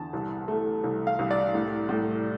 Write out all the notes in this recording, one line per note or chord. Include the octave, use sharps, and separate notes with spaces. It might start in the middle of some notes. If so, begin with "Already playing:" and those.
Already playing: E2 D3 A5
C2
A3
C2
F5
C2
D5
A2
A2